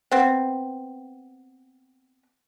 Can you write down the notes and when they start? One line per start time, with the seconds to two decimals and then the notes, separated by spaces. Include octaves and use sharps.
0.11 B3 C4